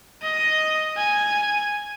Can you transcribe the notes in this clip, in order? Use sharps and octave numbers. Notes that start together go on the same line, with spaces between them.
D#5
G#5